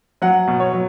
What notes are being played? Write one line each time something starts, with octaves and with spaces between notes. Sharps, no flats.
F#3 F#5
B2
C#5
F#3